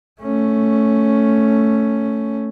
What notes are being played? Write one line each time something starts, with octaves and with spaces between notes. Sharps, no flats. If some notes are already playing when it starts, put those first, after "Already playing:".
A3 C#4